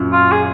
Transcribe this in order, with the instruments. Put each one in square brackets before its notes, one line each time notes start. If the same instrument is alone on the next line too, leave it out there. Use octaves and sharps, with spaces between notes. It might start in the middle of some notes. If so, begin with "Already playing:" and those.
Already playing: [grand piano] F#2 A#2
[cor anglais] F4
G#4